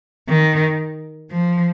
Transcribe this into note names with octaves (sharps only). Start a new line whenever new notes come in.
D#3
F3